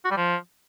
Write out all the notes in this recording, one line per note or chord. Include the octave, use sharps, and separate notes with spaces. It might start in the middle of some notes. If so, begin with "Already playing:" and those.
F#4
G3
F3